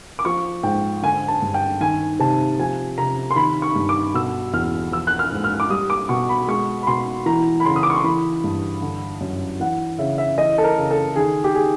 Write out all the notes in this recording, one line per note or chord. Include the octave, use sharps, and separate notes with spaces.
D6
F3 C#6
G#2 G5
D3 G#5
A5
G2
G5
D#3 G#5
C3 A5
F3 G#5
C3 A#5
C6
D#3 B5
C#6
G2
D6
B2 E6
E2 F6
F3 E6
F#6
F6
G#2
F6
D6
G3 D#6
D6
B2 C#6
B5
G#3 C#6
B5
B2 C6
E3 A#5
B5
C#3 C6
D#6
D6
C#6
C6
E3 B5
G2
D3
F#2
E3 F#5
C#3 E5
E5
E3 D#5
A4
A#4
C#3
A4
D#3 G#4
G4
G#4